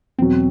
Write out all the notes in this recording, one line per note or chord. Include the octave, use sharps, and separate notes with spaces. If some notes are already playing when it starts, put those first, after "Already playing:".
E2 B2 F#3 C4